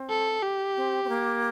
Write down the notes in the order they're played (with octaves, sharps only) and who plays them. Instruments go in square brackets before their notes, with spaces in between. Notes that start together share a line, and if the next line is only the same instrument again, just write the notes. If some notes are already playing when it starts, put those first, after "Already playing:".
Already playing: [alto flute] C4
[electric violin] A4
G4
[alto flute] C4
C4
A#3